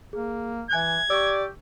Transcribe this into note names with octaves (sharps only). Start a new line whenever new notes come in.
A#3 G#4
E3 E5 G#5 F#6 G#6
G4 D5 C#6 E6